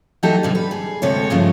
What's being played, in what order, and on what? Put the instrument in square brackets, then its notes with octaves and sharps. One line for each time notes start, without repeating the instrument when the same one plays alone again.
[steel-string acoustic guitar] E3 F#3 A3 D#4 G4 A4
B2 D3 G3
B4
G#4
D2 C3 G#3 A4 C#5
G2 C#3 F3 G#3 A3